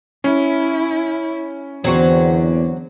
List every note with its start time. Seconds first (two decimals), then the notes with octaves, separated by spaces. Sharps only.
0.24 C#4 E4
1.84 E2 D3 F#3 C4 F#4